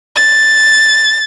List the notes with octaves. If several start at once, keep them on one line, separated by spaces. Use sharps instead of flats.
A6